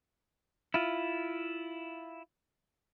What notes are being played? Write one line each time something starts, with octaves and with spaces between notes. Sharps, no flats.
E4 F4